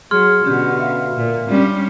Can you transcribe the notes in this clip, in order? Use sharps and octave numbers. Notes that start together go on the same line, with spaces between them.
F#3 G#4 C6 F6
B2 D3 C#4 G4
E5 F5
A#2
G3 C#4 D4